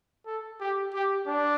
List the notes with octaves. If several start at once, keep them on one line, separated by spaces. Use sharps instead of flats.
A4
G4
G4
D4